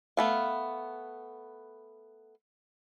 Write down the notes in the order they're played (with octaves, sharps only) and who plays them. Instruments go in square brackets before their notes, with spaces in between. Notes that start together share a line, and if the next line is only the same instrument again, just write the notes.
[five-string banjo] A3 B3 F5